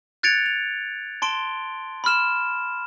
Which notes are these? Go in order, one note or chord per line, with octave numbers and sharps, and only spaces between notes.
F#6 G#6 A6 C#7 D7 F7
F7
A5 C6 D7 G7
B5 C6 F6 E7